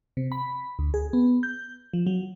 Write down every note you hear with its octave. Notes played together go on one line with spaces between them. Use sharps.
C3
B5
D2
G#4
B3
G6
F3
F#3